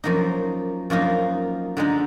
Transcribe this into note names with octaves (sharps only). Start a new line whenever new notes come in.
F#2 F3 A#3 D#4
F#2 F3 A#3 D#4
D3 G#3 D#4